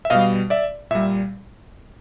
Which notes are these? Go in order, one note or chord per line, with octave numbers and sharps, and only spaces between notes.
E5
B2 G3 D#5 F5
D5 E5
A#2 G3 E5